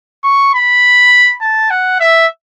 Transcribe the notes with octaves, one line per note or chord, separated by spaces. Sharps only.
C#6
B5
A5
F#5
E5